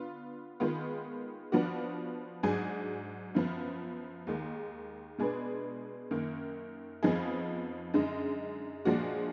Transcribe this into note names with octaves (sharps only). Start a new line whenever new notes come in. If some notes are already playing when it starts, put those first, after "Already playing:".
Already playing: D3 B3 F4
D#3 G#3 B3 F4
F3 B3 D4 F#4
G#2 F#3 D4 G#4
F#2 F3 B3
D#2 D#3 G#3
B2 G#3 D4 G#4 B4
F#2 D#3 A#3
F2 F3 B3 D#4 G#4
F#2 D3 G#3 D#4
A#2 F3 G#3 D4 F#4